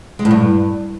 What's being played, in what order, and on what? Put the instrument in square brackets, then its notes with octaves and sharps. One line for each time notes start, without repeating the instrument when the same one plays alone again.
[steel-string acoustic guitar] G#3
A2
G2